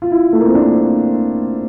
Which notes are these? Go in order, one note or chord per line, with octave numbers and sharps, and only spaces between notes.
F4
E4
A3
A#3
C4
D4